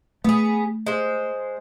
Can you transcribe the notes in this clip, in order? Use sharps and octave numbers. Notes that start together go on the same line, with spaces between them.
A3 B3 G#4
G#3 C5